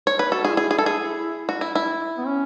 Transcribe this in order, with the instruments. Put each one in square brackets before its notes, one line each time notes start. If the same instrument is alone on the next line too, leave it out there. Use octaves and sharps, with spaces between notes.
[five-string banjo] C#5
B4
[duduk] F#4 [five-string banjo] A4
[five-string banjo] G#4
[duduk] E4
[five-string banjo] G#4
G#4
A4
G#4
F#4
E4
E4
[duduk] B3
C#4